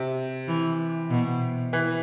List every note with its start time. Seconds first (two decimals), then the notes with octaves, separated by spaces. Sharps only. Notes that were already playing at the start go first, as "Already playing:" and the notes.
Already playing: C3
0.48 E3
1.10 B2
1.73 E3